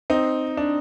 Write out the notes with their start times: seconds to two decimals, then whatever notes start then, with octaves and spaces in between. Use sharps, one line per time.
0.10 C4 D#4
0.57 D4